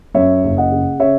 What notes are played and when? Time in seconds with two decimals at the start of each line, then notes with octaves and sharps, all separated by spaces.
0.15 F#2 C#5 E5
0.44 F#1
0.57 D#5 F#5
0.72 C#3
0.99 C#3 C#5 E5